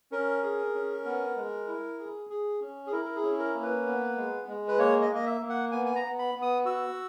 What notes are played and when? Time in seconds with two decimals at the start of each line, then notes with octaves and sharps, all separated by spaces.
0.12 C#4 A#4
0.43 G#4
0.75 C#4
1.05 B3
1.36 G#3
1.67 E4
1.99 G#4
2.30 G#4
2.61 C#4
2.87 G#4
2.92 E4 A#4
3.04 A#4
3.15 G#4
3.23 C#4
3.39 A#4
3.55 A#3
3.62 B4
3.86 B3
4.17 G#3
4.48 G#3
4.68 B4
4.79 A#3 C#5
5.02 D#5
5.10 A#3
5.15 D#5
5.26 E5
5.41 A#3
5.49 F#5
5.72 B3 G#5
5.86 G#5
5.95 A#5
6.04 B3
6.19 B5
6.35 B3
6.42 D#6
6.65 F#4 E6